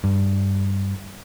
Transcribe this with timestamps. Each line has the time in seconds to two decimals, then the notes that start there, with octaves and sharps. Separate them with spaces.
0.04 G2